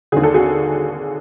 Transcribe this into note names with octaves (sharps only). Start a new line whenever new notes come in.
D#2 D3 G#4
A4
F#4 G#4